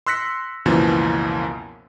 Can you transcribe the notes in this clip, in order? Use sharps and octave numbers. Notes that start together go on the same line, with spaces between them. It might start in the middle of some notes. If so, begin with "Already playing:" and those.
C6 E6 F#6 A#6 B6 C#7
C#2 F#2 B2 E3 F3 A#3